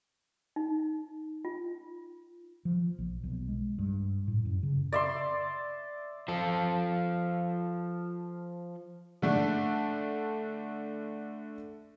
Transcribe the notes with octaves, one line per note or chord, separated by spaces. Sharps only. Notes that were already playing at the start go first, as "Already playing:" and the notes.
D#4
F4
F3
A#1
B1
G#3
G2
A2
F#2
C#3
D5 E5 C6
F3 A4
D3 A3 D4